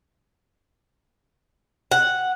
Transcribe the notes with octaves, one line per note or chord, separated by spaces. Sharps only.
F#5